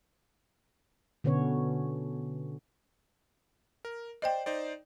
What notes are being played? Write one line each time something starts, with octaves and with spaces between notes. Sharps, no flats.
B2 D3 B3 C#4 C#5
A#4
C5 D5 D#5 G5
D#4 C5 D5